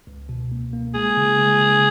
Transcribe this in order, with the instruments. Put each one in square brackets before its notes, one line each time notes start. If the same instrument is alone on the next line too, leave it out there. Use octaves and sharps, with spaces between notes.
[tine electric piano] C#2
B2
A#3
A#3
[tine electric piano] G#3 [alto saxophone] G#4
[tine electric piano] C#3
G#3
C#3